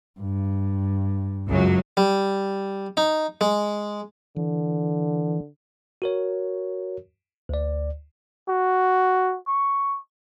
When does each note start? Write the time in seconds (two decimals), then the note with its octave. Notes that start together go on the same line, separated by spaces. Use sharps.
0.20 G2
1.49 C#2 F#2 F#3
1.97 G3
2.97 D#4
3.41 G#3
4.37 D3 E3
6.02 F#4 A#4 C#5
7.49 D2 D5
8.49 F#4
9.47 C#6